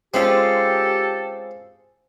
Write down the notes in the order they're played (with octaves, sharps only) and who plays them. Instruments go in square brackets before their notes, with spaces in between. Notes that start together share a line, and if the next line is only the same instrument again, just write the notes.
[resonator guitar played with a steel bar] G#3 C#4 F4 [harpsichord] C4 [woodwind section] G4 A4